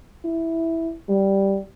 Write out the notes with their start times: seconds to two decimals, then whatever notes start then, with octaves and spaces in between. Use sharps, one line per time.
0.25 E4
1.09 G3